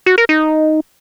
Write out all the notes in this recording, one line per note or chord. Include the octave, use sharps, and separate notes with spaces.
F#4
A#4
D#4